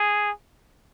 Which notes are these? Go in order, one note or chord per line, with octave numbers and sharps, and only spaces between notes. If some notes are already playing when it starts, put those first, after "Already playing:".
Already playing: G#4